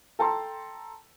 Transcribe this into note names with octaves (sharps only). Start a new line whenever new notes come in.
A4 G5 A5 A#5 C6